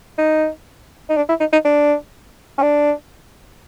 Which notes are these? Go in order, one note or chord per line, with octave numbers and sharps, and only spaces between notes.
D#4
D#4
D4
E4
D#4
D#4
D4
C#4
D4